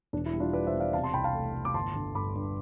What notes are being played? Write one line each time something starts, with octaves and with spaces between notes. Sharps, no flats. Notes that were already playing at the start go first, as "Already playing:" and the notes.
E1 D4
E4
G3
D4 F4
G3 B4 D5
C5 E5
E1
D5 F5
C3 F5 A5
A5 C6
C2 G5 B5
F5 A5
A3
A3
D6
G1 A5 C6
D3
G2 B5 D6
G2